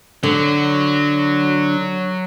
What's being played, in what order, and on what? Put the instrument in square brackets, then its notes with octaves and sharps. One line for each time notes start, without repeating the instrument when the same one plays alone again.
[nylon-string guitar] D3 [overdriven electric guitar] F#3